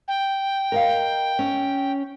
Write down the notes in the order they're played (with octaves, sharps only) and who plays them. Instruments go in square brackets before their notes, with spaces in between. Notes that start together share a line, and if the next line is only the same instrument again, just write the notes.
[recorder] G5
[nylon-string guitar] A#4 D#5 F5
C#4